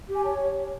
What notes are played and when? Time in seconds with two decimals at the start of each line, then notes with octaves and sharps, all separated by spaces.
0.08 G4
0.15 G#5
0.24 C#5 A5